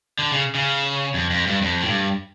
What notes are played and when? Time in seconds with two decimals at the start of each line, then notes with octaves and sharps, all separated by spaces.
0.19 D3
0.32 C#3
0.55 C#3
1.14 F2
1.30 F2
1.47 G2
1.62 F2
1.82 A2
1.86 G2